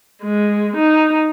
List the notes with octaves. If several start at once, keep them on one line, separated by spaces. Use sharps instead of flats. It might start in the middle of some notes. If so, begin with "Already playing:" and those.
G#3
D#4